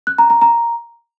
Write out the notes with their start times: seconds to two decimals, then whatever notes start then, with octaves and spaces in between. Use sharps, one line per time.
0.07 F#6
0.18 A#5
0.30 A#5
0.41 A#5